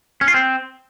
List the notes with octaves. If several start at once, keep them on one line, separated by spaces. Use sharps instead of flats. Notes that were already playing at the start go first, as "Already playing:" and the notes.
C#4
F4
C4